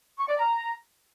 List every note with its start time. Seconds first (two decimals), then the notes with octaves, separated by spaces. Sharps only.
0.18 C#6
0.28 D5
0.38 A#5